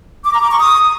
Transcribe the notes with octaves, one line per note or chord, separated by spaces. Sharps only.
D6
A#5
D6
C#6
D#6